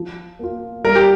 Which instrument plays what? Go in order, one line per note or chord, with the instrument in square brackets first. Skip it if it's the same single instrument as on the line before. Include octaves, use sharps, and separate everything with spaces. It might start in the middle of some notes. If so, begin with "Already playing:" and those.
Already playing: [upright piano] F3
A#3 F4
[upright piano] G3 [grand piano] A#4
[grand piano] G4